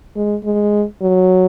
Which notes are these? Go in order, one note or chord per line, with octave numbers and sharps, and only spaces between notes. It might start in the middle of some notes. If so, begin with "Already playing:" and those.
G#3
G#3
F#3